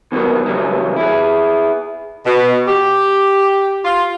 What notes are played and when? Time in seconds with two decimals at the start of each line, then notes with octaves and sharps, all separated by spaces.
0.12 B2 D#3 E3 F#3 G3 A#3
0.46 C#3 E3 F#3 G3
0.96 E4 G#4
2.25 B2
2.67 G4
3.84 F4